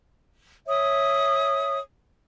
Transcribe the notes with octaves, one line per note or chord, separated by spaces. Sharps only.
C#5 E5 D#6